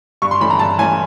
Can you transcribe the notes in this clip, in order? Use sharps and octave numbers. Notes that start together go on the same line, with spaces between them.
G2 C#6
C6
E3 A3 C#4 B5
A#5
G2 A5
E3 A3 C#4 G#5